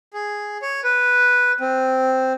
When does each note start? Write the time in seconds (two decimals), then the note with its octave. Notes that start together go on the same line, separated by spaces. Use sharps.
0.14 G#4
0.62 C#5
0.84 B4
1.61 C4